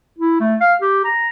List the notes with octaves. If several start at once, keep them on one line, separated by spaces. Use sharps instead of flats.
E4
A3
F5
G4
A#5